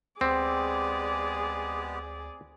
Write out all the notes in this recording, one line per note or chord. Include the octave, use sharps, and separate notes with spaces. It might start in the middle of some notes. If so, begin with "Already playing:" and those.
D2 G#3 B3 C4 G4 G#4 D5